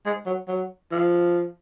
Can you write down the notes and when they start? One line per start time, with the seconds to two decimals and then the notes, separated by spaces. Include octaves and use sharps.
0.06 G#3
0.26 F#3
0.48 F#3
0.91 F3